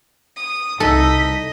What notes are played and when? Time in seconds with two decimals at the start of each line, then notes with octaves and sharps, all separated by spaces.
0.36 D#6
0.80 C2 D#4 A4 D#5 B6